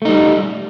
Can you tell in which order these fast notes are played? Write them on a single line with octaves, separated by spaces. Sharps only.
A3 D#4 G3